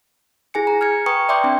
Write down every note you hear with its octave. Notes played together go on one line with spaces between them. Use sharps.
E4 G#4 G#5 C#7
A#5
F6 G#6 C#7
B4 G5 A#5 C#6 D#6 C#7
D5 E5 G5 C6 D6 G6
C4 D4